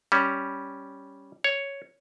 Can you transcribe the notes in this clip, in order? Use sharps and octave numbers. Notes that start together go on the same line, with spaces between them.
G3 C#4
C#5